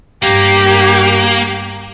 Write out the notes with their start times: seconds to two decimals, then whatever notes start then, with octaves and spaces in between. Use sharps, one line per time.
0.23 G2 A#3 G4